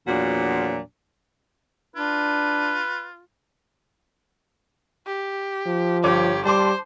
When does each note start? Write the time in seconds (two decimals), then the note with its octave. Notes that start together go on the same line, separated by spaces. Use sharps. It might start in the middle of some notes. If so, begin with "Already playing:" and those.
0.08 E2 A#2 F3 F#3 D4 F#4
1.96 D4 F4 B4
5.06 G4
5.66 F3
6.04 G1 G4 C#5 D6
6.45 G3 C5 A5 C6 D6